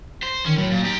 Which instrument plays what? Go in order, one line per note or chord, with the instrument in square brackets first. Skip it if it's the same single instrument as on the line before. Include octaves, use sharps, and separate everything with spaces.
[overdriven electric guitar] C5
[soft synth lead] D#3 [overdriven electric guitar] C#4
[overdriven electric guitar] A2 [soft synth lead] F#3
[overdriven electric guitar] A#2
[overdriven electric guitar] D#4 G4 [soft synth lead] A#5